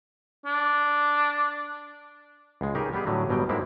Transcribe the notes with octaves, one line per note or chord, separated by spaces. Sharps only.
D4
C#2 G#3
C#3 D#4 G4 G#4 A#4
G3 B3 G4 G#4
A2 D3 F#3
G1 B2 F#3 G3 G5
G#2 G#3 A#3 C4 E4